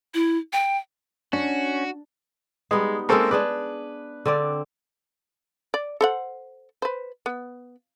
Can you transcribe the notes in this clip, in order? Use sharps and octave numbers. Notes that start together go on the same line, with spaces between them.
E4
G5
C#4 D4 F#4
G3 G#3 B3 D#4
G#3 A#3 C4 C#4 A4
D4 G#4 B4 D5
D3 C4 D5
D5
A4 C5 F#5
B4 C5
B3